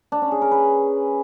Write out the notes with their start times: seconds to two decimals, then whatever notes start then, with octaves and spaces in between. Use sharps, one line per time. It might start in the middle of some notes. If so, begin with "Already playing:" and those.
0.12 D4
0.22 C#4
0.32 G#4
0.42 A#4
0.51 B4